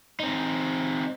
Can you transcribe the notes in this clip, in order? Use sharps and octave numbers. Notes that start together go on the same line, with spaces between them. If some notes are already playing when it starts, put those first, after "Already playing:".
C4 D#4